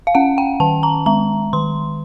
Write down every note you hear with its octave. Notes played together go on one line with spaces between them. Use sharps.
F5
C#4 F#5
G5
D#3 A5
A#5
G#3 A#5
D#3 C6